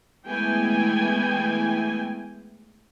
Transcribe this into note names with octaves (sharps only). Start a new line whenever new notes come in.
E3 G#3 A3 B3 G5 G#5